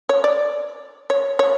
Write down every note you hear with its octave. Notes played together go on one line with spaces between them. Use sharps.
C#5
D5
C#5
C#5